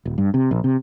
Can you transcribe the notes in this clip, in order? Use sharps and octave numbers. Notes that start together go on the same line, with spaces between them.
D#1
G2
C3
A#1
C3